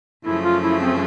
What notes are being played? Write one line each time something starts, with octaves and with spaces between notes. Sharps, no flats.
F#2 C#3 F3 A3 E4
F4
E4
C4